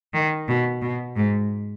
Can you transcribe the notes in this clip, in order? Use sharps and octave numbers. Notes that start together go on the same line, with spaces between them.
D#3
B2
B2
G#2